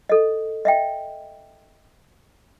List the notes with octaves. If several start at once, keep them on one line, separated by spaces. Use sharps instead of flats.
A4 D#5
D#5 E5 G5